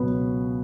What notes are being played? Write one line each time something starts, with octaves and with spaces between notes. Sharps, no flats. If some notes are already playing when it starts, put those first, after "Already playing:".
Already playing: C#2 B2 F#3 B3